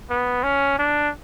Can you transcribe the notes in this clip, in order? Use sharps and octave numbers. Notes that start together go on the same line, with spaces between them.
B3
C#4
D4